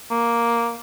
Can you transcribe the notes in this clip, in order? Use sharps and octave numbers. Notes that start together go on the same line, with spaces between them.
A#3